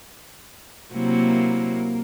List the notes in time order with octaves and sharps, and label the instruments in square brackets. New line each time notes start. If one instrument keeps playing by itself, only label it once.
[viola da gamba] C3 F#3 E4 [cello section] A#3